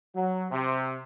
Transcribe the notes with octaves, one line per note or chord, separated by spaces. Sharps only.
F#3
C3